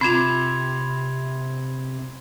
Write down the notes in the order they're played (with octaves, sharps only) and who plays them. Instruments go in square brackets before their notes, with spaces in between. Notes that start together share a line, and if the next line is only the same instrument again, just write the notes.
[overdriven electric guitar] C3 [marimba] C4 F4 [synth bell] B5 [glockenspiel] C6 G#6 F7